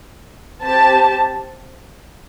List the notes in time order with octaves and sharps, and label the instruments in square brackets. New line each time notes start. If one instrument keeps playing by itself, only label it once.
[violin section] C4 G4 A5